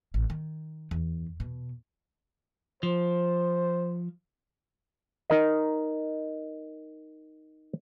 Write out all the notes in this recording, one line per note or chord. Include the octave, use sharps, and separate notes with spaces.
A1
D#3
E2
B2
F3 C5
D#4 A#4 D#5